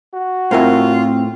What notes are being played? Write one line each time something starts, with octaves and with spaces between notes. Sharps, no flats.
F#4
A2 C4 F4 A#4 E5